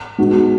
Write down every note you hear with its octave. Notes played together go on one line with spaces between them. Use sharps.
G#3 B3 D#4 F#4